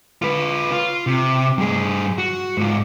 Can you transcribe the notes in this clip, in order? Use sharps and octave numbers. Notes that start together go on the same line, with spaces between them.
F4 B4
F4
C3
G2 G#4
F#4
G#2 F4